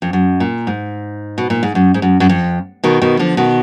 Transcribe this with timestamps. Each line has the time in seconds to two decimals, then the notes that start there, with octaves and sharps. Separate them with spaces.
0.02 F2
0.13 F#2
0.40 A#2
0.67 G#2
1.38 B2
1.50 A#2
1.63 G#2
1.75 F#2
1.94 G#2
2.02 F#2
2.20 F#2
2.29 F2
2.84 B2 D#3
3.02 B2 D#3
3.19 D3 F3
3.37 B2 D#3